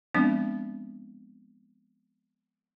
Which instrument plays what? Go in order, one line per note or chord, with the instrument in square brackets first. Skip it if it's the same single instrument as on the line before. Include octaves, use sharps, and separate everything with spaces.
[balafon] F3 G#3 B3 C4 D4